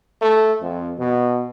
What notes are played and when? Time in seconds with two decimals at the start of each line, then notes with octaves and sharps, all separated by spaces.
0.22 A3
0.61 F2
0.99 B2